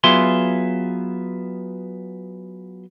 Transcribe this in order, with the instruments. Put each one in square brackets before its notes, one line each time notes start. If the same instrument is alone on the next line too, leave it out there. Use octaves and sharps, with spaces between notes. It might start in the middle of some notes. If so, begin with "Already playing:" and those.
[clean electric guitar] F#3 B3 F4 G#4 E5 C6